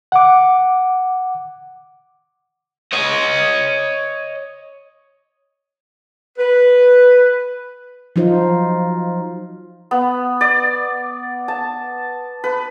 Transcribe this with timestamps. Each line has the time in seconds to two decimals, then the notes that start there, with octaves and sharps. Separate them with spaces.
0.12 F#5 D6
2.93 C#5 D#5
6.39 B4
8.16 F3 F#3 D#4 F4 C5
9.91 B3
10.41 D5
11.48 A5
12.44 B4